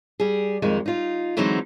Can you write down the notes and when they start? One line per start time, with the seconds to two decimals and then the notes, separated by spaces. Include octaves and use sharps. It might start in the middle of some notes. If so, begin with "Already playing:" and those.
0.20 G3 G#4
0.62 F2 D#3 G#3 D#4
0.86 D#4 F4
1.37 D3 E3 F#3 G#3 C4 D#4